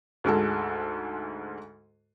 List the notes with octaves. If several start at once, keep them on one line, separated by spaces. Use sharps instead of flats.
D2 G#2 G#3 A4